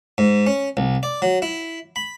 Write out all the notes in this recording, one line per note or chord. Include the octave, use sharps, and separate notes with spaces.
G#2
C#4
C2
D5
F#3
E4
B5